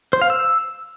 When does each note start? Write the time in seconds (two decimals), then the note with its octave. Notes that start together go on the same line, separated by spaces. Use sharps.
0.13 C5
0.22 F5
0.30 E6